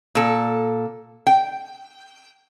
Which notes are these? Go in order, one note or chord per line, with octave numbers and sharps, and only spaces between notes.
A#2 A4
G5